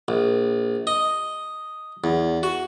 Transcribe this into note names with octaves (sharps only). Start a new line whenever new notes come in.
A#1
D#5
E2
F#4